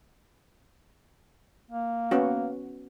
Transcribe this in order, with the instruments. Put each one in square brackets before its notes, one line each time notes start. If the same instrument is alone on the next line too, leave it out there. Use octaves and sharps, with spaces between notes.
[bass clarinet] A#3
[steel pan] B3 C#4 F#4